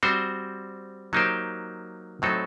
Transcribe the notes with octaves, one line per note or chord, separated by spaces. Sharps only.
G3 C4 F#4 C5
F#3 A#3 D#4 G4 C5
A2 F#3 C4 D#4 A4